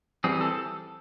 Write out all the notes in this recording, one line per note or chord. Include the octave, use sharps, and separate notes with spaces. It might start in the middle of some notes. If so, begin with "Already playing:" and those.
E3 G3 C4 G#4
A4